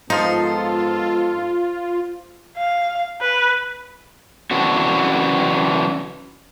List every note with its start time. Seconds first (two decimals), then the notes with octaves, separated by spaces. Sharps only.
0.10 G#2 F3 B3 D#4 F4 A4 C5
2.57 F5
3.21 B4
4.51 C#3 E3 F#3 C4 D4 F#4